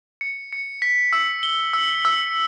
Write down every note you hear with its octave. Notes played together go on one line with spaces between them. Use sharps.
C#7
C#7
B6
E6
G7
E6
E6